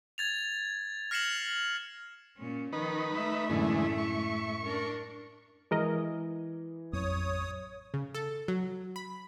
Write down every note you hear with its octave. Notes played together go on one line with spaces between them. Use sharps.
G#6 A6 F7
F6 A#6 C7 C#7 E7 F#7
A#2 C#4
D#3 F3 D#4 B4
A3 E5
F#2 A2 D3 E3 G#3
C#6
D4 A#4
E3 G#3 A#4 D#5
A1 F2 F#3 C#5 D#6
C#3
A4
F#3
B5